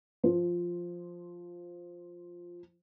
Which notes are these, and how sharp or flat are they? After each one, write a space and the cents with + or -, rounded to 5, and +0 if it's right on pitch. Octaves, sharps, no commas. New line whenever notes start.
F3 +0 C5 +0